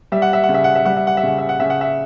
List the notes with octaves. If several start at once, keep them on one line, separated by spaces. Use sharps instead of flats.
G3 E5
F#5
E5
F#5
C#3
E5
F#5
E5
G3 F#5
E5
F#5
E5
C#3 F#5
E5
F#5
C#3 E5
F#5
E5